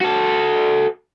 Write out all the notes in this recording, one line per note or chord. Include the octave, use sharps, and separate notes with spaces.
F#4 A4